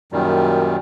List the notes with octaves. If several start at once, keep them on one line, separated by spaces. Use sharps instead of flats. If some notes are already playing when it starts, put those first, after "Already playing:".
F#2 A#2 D#3 G3